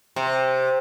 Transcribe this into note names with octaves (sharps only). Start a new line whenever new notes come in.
C3